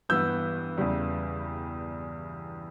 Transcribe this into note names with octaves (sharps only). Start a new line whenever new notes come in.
G2 E3 B3 E6 G6
E2 C#3 G3